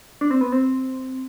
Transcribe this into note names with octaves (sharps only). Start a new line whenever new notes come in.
D4
C4
B3
C4